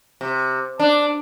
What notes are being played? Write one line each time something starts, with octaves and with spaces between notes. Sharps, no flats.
C3
D4